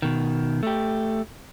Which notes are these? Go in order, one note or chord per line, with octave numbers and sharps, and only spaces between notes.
B2 D#3
A3 G4